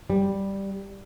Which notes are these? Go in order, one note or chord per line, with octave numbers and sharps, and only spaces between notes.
G3